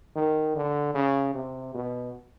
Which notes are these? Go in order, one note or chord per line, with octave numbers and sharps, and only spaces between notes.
D#3
D3
C#3
C3
B2